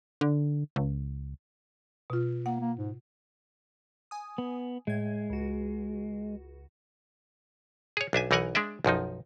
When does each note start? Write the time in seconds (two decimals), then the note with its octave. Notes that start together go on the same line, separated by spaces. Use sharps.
0.21 D3
0.76 C#2
2.10 B2 F4
2.46 A#3 F#5
2.61 A#3
2.77 G#2
4.11 G#5 D#6
4.38 B3
4.87 A2 G#3 G#6
5.30 C#2 F#4
7.97 G#4 C#5
8.13 B1 D4 E5 G#5
8.31 B1 E3 D#4 A#4 F#5 G#5
8.55 G#3 D4 D5 E5
8.85 B1 F#2 F3 D#4